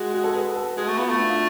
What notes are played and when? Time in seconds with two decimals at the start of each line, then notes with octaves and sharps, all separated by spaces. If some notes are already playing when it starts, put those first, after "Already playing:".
Already playing: G#3 F#4
0.14 F#4
0.24 A4
0.35 B4
0.56 A4
0.77 G#3 F#4
0.88 A3
0.98 B3 F4
1.09 A3
1.20 D4
1.30 F4